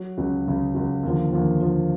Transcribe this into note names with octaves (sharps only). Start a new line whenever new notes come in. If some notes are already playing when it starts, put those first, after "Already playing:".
Already playing: F#3
C#2 C#3 F#3
C#2 C#3 F#3
C#2 C#3 F#3
D#2 D3 F3
D#2 D3 F3
D#2 D3 F3